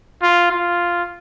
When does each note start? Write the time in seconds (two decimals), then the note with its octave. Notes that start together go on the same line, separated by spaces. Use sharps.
0.22 F4
0.51 F4